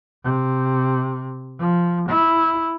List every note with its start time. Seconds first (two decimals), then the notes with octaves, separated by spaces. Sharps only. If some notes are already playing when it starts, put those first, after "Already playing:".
0.24 C3
1.59 F3
2.09 E4